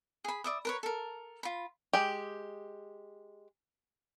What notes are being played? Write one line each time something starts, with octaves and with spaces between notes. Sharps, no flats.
G#4 B5
D5 E5 D#6
A#4 B4 C#5
A4 A#4
F4 B5
G#3 G4